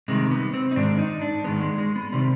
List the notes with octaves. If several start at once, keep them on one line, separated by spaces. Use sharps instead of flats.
C3 D#3 G3 G#3
B3
C4
D#4
G#2 D#3 G#3 D4
D#4
D4
G#2 D#3 G#3 B3
G#3
G#3
B3
C3 D#3 G3 C4